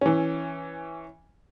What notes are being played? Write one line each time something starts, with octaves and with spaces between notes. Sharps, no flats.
E3 C#4